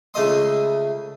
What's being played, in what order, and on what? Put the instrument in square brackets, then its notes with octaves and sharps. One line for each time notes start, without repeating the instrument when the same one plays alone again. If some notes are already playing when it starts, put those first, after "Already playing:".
[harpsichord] C#2 C#3 A3 D#5 C6